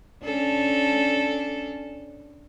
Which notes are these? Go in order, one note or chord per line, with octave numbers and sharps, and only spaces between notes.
C#4 D4 A4